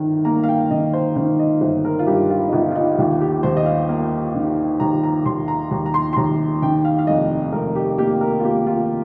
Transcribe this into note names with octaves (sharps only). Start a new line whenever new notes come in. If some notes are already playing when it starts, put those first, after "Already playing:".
Already playing: G1 D#3
A#3 A#5
F5
G5
D#3 D#5
C5
D#3 C5
D#5
G1 C5
A#4
F4
G2 G4
F4
D#4
G1 F4
F4
D#4
D#2 F4
G4
D#2 C5
D#5
F5
A#3
D#3
D#2 A#5
A#5
D#2 C6
A#5
D#2 A#5
A#5
C6
C6
D#2 A#5
D#3 G5
F5
F5
F1 D#5
F1 A#4
G4
A#3 G4
A#4
F4
A#3 G4
F4